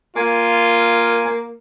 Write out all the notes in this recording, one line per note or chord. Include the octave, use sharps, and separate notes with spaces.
A#3 F4 G#5